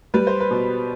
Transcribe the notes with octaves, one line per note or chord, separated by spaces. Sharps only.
G3 B4
C5
B4
B2